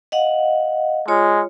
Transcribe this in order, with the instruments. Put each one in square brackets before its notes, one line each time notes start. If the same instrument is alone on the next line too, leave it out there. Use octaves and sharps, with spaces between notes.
[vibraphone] D#5 F5 F#5
[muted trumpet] G#3 [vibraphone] F4 C#5